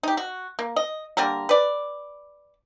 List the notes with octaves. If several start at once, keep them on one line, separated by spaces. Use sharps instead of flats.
D#4 G4
F#4
A#3
D#5
D3 G3 A#3 A#4
B4 D5